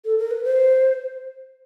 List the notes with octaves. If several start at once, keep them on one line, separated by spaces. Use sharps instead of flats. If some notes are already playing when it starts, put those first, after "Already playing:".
A4
A#4
B4
C5